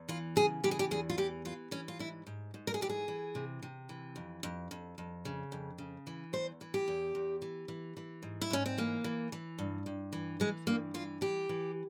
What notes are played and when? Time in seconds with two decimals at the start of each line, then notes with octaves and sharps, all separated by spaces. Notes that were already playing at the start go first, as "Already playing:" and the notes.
Already playing: E2
0.09 E3 F4
0.36 C#3 G#4
0.64 E3 G4
0.71 G#4
0.79 G4
0.91 E2 G#4
1.09 F4
1.18 E3 G4
1.45 E3 F4
1.71 E3 C#4
1.88 F4
1.99 G#2 E4
2.27 G#2
2.54 G#2
2.67 A#4
2.74 G#4
2.81 E3 G4
2.89 G#4
3.08 E3
3.35 C3
3.63 C3
3.89 E3
4.16 F2
4.43 F2
4.71 F2
4.98 F2
5.25 C#3
5.52 F2
5.78 C#3
6.07 E3
6.33 E2 C5
6.61 E3
6.74 G4
6.88 E2
7.15 E2
7.42 E3
7.68 E3
7.97 E3
8.23 G#2
8.41 E4
8.50 G#2 C#4
8.66 C4
8.78 E3 A#3
9.04 E3
9.32 E3
9.59 G2
9.86 G2
10.13 E3
10.40 E3 G#3
10.67 G2 A#3
10.94 E3 F4
11.21 E3 G4
11.49 E3